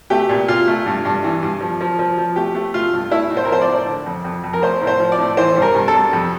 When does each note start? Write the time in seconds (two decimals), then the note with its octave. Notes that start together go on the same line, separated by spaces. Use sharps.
0.10 A3 G4
0.29 A#2
0.48 A#2 F4
0.67 A3
0.86 G2
1.05 G2
1.24 E3
1.43 G2
1.61 F3
1.81 F3
1.99 F3
2.18 F3
2.36 A3 G4
2.55 A3
2.74 A3 F4
2.93 G2
3.11 A3 E4
3.31 A2
3.37 C5
3.45 A#4
3.50 F3 C5
3.62 D5
3.68 A2
3.86 D3
4.06 F2
4.24 F2
4.44 F2
4.53 A#4
4.62 A3 C5
4.81 A2
4.87 C5
5.00 F3
5.12 D5
5.19 A2
5.37 E3 C5
5.57 G2
5.62 A#4
5.75 G2
5.88 A4
5.94 G2
6.13 F2